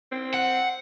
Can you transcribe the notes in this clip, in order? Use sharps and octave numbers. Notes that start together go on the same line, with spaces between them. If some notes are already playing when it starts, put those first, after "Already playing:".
C4
F#5